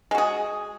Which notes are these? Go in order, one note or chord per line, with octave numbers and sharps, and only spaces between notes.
G#3 F#4 G#4